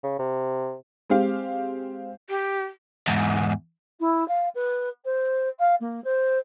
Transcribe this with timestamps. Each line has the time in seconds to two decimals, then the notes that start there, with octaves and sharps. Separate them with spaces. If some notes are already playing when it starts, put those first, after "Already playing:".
0.03 C#3
0.19 C3
1.10 G#3 C4 G4 F5
2.28 G4
3.07 E2 G#2
4.00 E4
4.28 F5
4.55 B4
5.05 C5
5.59 F5
5.80 A#3
6.04 C5